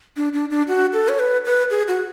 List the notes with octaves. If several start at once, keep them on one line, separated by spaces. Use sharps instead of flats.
D4
D4
D4
F#4
A4
C#5
B4
B4
G#4
F#4